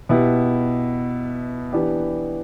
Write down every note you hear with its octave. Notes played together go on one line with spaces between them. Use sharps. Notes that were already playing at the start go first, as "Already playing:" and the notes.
B2 B3 E4 G4
E3 B3 D4 G4